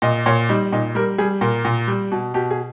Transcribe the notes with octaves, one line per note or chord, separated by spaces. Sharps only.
A#2 D#5
A#2 C#5
G3 D#4
A#2 D#4
G3 A#4
G3 G#4
A#2 A#4
A#2
G3
B2
B2 G4
G#4